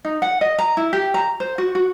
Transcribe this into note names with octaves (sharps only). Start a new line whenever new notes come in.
D#4
F#5
D#5
A#5
E4
G4
A#5
C5
F#4
F#4